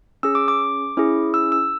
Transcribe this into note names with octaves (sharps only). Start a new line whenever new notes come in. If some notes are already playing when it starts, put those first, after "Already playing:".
C#4 G#4 E6
D6
D6
C#4 E4 G#4
E6
E6